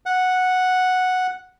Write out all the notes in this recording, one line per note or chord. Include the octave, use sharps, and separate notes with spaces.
F#5